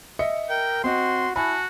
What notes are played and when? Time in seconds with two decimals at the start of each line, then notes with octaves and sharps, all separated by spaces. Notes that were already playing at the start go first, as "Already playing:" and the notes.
0.19 D#5 E5 C#7
0.49 A#4 G5
0.84 C4 F#4 D#5 C6
1.36 E4 F#4 G#5 A5 B5